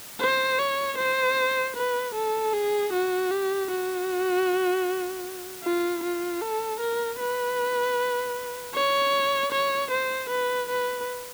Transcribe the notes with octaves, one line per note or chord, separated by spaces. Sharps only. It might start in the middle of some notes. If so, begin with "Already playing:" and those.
C5
C#5
C5
B4
A4
G#4
F#4
G4
F#4
F4
F4
A4
A#4
B4
C#5
C#5
C5
B4
B4